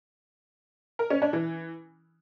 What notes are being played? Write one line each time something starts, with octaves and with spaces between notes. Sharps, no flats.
A#4
C#4
D4
E3